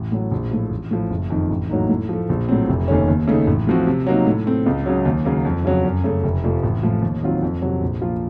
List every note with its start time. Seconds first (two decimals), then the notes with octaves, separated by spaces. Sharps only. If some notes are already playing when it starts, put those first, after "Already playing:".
Already playing: A1
0.12 A2 F#3
0.31 A#1
0.51 A2 F3
0.71 A1
0.91 A2 F3
1.10 F#1
1.30 F2 D#3
1.50 A1
1.69 A2 F#3 A#3 D#4
1.89 A2
2.09 F3 A3
2.29 A#1
2.49 A2 F#3 C4
2.69 F1
2.88 D#2 D#3 A3 C#4
3.08 D#2
3.28 C#3 A3 D#4
3.47 A1
3.67 A2 F3 C4 F#4
3.87 C3
4.06 F#3 A#3 D#4
4.26 A2
4.46 A3 C4
4.66 C#2
4.86 C#3 F#3
5.05 D#2
5.25 C#3 F#3 A#3
5.45 F2
5.65 C#3 F#3
5.84 F#2
6.04 C#3 A3
6.24 F1
6.43 F2 C3 F3 A3
6.63 A1
6.83 A2 F3
7.02 D#2
7.23 D#3 F#3 C4 F4
7.42 F2
7.62 C3 F#3
7.81 A#1
8.01 A#2 F3 A#3 F4